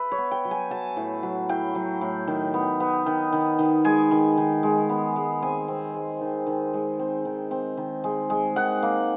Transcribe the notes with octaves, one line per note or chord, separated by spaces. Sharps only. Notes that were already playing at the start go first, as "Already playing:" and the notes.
Already playing: B4 E5
C#5
B3
G5
F#3
G#5
F#3 A5
A2
F#3
A2 G5
F#3
A2
D#3
B3
B3
D#3
D#3
D#3
G#3 G#5
D#3
D#3
G#3
B3
G#3
C4 G#5
C4
G#3
D#3
D#3
G#3
C4
D#3
C4
D#3
G#3
G#3
D#3 F#5
A#3